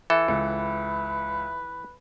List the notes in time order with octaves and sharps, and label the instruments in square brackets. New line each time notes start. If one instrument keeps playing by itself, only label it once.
[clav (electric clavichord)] E3 A4 [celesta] E5
[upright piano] C#2 [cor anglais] B4